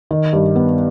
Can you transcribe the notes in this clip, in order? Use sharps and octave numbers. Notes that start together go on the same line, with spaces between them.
D#3
G2
B3